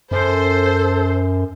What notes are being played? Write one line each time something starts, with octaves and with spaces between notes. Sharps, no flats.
F#2 A4 C5